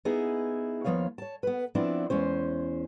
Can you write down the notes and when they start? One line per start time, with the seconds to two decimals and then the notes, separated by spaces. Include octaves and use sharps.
0.05 B3 D#4 E4 G#4
0.85 D#2 A#2 F3 B3 C#5 F5
1.18 C#5 A5
1.43 B3 B4
1.75 F3 B3 C4 D4 E4
2.10 E2 G#3 C#4 C5